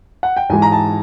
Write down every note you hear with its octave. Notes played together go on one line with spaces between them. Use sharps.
F#5
G5
G#2 E3 G#3 G#5
A#5
A5